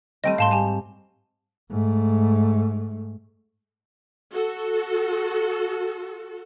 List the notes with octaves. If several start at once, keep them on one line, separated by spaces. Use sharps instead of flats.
G3 A3 C4 D#5 G5 D#7
G#2 F5 A5 C6
G4 G#5 A5
G#2 A3
F#4 A4